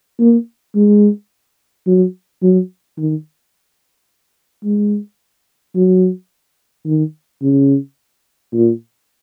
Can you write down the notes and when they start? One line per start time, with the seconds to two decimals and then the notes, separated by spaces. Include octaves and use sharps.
0.20 A#3
0.75 G#3
1.87 F#3
2.42 F#3
2.97 D#3
4.64 G#3
5.75 F#3
6.86 D#3
7.42 C#3
8.53 A#2